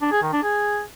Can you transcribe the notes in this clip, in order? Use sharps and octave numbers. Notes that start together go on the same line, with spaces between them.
D4
G#4
D#3
D4
G#4